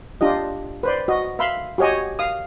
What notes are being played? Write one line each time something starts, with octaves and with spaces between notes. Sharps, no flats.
D4 F4 G4 D#5
B4 C5 D5
F#4 D#5
E5 F5 B5 C6
F#4 G4 C#5 D#5 G#5
F5 D#6